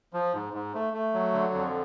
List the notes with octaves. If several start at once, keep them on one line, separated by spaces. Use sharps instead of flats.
F3
G#2
G#2
A3
A3
F#3
D3
F2